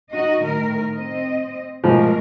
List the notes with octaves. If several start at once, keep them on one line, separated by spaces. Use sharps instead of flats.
D#4 F#4 D#5
A2 D#3 A#4
C4 D#5
G#2 B2 F3 A3 A#4